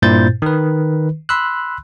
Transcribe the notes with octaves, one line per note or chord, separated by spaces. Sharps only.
G2 A#2 E4 C5 G6 A6
D#3 B4
B5 C6 E6 F#6